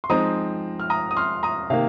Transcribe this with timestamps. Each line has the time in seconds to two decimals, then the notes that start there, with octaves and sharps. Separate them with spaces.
0.04 C6
0.10 F3 G#3 C4 D#4 A#5 D#6
0.80 F6
0.90 A#5 D#6
1.11 D#6
1.17 C6 F6
1.43 A#5 D#6
1.70 C3 D#3 A#3 F5